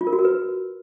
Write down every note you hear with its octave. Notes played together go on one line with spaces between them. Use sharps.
F4
A#4
F#4
A#4
B4